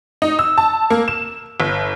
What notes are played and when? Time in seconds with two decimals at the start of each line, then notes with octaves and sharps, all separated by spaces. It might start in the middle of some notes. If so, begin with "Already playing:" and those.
0.22 D#4
0.39 E6
0.58 A5
0.90 A#3
1.08 E7
1.60 G1